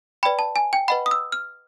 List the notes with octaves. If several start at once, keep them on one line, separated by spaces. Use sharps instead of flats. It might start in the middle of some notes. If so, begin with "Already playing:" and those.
B4 D5 G5 B5
A5
G#5
G5
B4 D#5 F#5 B5
D#6
E6
F6